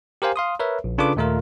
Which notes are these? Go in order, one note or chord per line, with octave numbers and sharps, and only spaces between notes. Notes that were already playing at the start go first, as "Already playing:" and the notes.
G4 A#4 C5 F5 G#5
F5 C6 D#6
A#4 B4 C#5 E5
A#1
C#3 D4 F4 A4 B4 D6
D#2 A#2 A3 F4 A#4